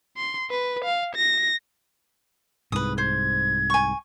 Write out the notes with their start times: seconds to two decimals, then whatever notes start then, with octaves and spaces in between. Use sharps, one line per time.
0.17 C6
0.51 B4
0.85 F5
1.16 A#6
2.72 C2 G#2 B4 D#6
2.98 C5 G#6
3.70 G#5 C#6